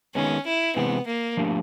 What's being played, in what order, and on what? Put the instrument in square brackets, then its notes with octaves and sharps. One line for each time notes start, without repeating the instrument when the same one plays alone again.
[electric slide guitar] D#3 G#3 B3 [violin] C#4
[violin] E4
[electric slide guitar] C3 E3 G#3 C4 [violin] B3
[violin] A#3
[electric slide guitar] F3 A3 D4 G4